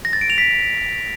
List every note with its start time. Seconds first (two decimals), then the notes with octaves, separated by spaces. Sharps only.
0.05 A#6
0.13 A6
0.21 D7
0.30 F7
0.38 B6